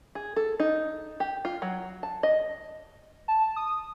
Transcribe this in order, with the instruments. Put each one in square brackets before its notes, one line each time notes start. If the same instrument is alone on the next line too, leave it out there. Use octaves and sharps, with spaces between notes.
[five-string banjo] G#4
A4
D#4
G4
F4
F#3
A5
D#5
[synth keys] A5
D#6